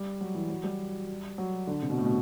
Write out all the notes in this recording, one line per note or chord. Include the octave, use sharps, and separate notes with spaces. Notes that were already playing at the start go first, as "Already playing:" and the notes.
Already playing: G3
F#3
E3
F#3
G3
F#3
D3
C3
B2
A2
B2